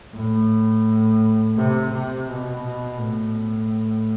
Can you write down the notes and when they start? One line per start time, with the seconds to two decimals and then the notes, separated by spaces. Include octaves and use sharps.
0.13 A2
1.56 C3
1.92 C3
2.28 B2
2.99 A2